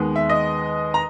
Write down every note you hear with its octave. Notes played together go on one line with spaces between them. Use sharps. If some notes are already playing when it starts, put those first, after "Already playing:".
Already playing: D#2 D#3 G#3 B3
E5
D#5
A#5